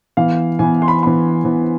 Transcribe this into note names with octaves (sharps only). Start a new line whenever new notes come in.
E3 B3 F5
E3 B3 G#5
C6
B5
E3 B3 B5
E3 B3